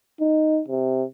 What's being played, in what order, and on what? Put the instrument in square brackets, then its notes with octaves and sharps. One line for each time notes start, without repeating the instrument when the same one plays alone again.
[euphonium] D#4
C3